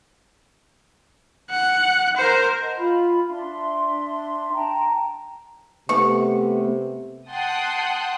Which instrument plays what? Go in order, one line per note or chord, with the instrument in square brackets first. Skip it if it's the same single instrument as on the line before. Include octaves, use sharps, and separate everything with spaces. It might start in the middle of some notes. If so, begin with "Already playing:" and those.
[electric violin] F#5
A#4 C5
[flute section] D#5 F#5 A5
F4 B5
D4 E5 C6
G5 A5 A#5
[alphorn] C3 [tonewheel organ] A3 B3 [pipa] C#6
[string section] F#5 G5 A5 C6 D#6 F#6